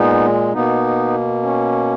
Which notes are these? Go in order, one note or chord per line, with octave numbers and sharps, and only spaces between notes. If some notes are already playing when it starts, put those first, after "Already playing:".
Already playing: A#2 G#3 B3 D#4
B2 A#3 B3 D#4
C#4